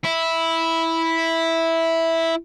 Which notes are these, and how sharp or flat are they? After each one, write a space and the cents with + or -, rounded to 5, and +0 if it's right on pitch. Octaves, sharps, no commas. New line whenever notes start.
E4 -5